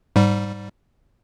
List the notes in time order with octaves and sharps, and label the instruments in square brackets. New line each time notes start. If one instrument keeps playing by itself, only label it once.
[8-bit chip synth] G#2 G3